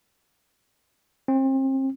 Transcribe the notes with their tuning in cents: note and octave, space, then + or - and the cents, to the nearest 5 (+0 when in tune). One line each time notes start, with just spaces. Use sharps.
C4 +35